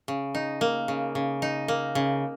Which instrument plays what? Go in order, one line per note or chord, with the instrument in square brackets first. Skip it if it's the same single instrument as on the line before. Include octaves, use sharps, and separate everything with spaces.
[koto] C#3
D#4
A#3
C#3
C#3
D#4
A#3
C#3